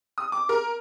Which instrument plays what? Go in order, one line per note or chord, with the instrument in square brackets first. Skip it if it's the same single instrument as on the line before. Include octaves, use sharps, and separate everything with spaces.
[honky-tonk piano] D#6
D6
A#4